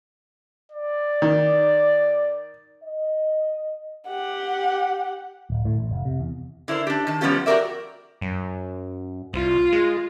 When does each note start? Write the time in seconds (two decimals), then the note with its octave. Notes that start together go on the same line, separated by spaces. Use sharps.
0.72 D5
1.22 D#3
2.83 D#5
4.08 G4 F#5
5.50 D1
5.65 A2
5.79 A1
5.91 F1
6.05 C3
6.20 E2
6.68 D3 E4 A#4 C5
6.87 D4 G4
7.07 D#3 A5
7.21 F3 G3 B3 C#4 F4 G4
7.46 F#4 G4 A4 A#4 D5 E5
8.21 F#2
9.34 C2 F4
9.72 G#3